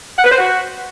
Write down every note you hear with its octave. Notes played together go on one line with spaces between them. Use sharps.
F#5
B4
C5
F#4